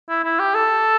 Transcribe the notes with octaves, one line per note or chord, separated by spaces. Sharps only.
E4
E4
G4
A4